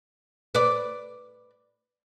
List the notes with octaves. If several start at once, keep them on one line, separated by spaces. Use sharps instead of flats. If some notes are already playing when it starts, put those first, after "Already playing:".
B4 D5